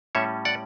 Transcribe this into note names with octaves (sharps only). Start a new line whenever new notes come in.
A2 G3 C#4 C#5 E5
D5 F#5